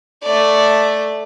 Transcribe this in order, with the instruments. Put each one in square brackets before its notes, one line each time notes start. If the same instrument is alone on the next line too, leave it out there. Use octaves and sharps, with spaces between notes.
[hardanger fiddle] A3 D5